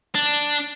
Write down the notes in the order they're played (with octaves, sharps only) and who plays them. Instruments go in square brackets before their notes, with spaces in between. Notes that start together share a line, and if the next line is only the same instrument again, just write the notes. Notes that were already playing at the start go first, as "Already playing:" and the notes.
[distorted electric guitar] D4